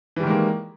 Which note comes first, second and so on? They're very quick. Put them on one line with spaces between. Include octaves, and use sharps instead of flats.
E3 G3 D#3 G#3 A#3